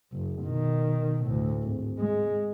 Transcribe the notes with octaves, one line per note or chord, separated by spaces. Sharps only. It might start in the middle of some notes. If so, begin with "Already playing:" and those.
F#1
B2 D#3
D2 A2
G#1
G#3